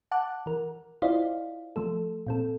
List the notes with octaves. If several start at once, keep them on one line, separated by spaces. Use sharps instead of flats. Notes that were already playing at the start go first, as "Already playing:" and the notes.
F#5 A5 D6 F#6
E3 A#4
E4 F4 C5 D5 D#5 F5
F3 A3 A4
A#2 C4 A4